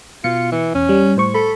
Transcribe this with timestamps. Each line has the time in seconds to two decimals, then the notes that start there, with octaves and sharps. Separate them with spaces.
0.24 B2 F4 C#7
0.52 E3
0.75 E2 C#4
0.89 G3
1.16 A2 C5 C#6
1.34 A4 B5